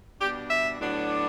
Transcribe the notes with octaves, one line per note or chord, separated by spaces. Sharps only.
B2 G3 D4 G4
E5
A2 F#3 B3 D4